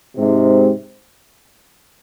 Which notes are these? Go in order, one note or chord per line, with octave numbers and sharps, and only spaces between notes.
G#2 C3